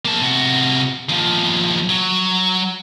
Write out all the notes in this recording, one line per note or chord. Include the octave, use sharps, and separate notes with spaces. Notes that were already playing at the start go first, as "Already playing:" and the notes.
A#3 A5
C3 F#4
D#2 F3
F#3